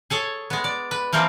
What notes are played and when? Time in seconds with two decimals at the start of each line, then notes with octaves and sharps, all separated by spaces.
0.10 G#4 A4 C#5
0.50 G#3 B3
0.64 D5
0.91 B4
1.13 E3 F3 G3 A#3 C4